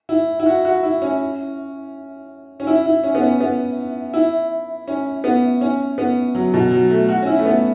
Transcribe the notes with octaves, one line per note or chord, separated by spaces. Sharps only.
E4
E4
F#4
F#4
E4
C#4
C#4
E4
E4
C#4
B3
C#4
B3
E4
C#4
B3
C#4
B3
F#3
B2
F#3
A3
F#4
C#4
E4
A3
B3